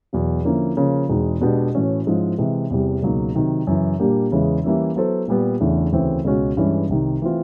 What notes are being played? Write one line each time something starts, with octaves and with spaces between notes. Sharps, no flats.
E2 B2 F#3
D3 F3 A#3 C#4 E4
C#3 F3 A#3 C#4
E2 B2 G#3 C4 D#4
B2 G#3 B3 D4 G4
A2 E3 A3 C#4 F#4
G#2 F3 G#3 C#4 E4
C3 E3 G#3
E2 C3 E3 G3
C#2 B2 F#3 A#3 D#4
C3 D#3 F#3
F#2 C#3 E3
A#2 G3 A#3 D4 G4
E2 C#3 E3 G#3
E3 G3 A#3 C#4 E4
F#3 B3 E4 A4 C5
A#2 G3 B3
E2 C#3 E3 A3 D4
D2 C#3 E3 A3 C4
C#2 B2 G#3 C#4 F#4
G2 E3 G#3 C#4
C2 C3 D#3
E3 A3 C4 F4